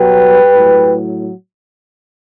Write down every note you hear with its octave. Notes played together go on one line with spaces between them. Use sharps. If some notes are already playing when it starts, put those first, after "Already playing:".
Already playing: B2 F#3 G4 B4
A2 F#3